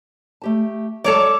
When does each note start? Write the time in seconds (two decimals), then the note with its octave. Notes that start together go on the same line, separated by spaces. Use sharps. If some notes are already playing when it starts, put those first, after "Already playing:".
0.42 A3 G4 A5
1.04 F#3 G#3 A4 C#5 D5 A5